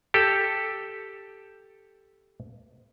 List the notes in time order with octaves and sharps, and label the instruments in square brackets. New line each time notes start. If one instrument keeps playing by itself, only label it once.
[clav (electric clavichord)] G4 A4